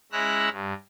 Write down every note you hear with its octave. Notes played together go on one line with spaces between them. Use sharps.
G#3 C#4 E4 A#5 E6 F#6
G2